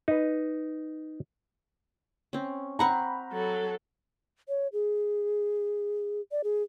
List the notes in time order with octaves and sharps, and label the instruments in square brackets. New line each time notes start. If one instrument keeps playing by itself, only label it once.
[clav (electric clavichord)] D#4 B4
[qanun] C4 C#4
[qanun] C4 F#5 C#6 [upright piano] A#5 B5
[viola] F#3 A4
[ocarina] C#5
G#4
D5
G#4